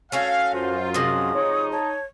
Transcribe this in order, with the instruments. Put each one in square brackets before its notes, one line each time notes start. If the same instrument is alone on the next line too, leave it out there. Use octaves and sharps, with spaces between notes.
[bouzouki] A3 C#4 F#4 [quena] C#5 [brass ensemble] F5
[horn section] F#2 [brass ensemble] F4 [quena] C5
[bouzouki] C3 F3 G#3 [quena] D#6
[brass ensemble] D#4 [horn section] C#5
[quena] C#5 [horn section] A5